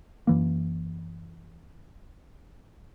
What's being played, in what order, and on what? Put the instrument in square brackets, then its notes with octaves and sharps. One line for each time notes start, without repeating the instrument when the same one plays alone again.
[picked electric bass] F#2 E3 A#3